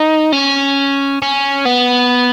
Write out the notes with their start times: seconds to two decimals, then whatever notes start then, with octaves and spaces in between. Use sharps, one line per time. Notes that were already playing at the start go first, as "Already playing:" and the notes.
Already playing: D#4
0.32 C#4
1.22 C#4
1.65 B3